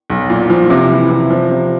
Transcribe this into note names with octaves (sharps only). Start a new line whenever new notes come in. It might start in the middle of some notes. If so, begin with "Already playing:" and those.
B1
A#2
F3
C3
E3
C3
F3
C3